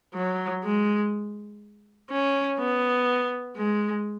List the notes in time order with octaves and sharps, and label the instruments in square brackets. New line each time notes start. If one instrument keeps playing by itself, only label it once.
[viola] F#3
G#3
C#4
B3
G#3